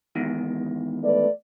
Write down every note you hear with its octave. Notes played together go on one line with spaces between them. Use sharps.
E2 G#2 D#3
A3 B4 D5